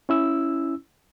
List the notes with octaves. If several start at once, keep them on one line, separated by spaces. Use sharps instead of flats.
C#4 E4 E6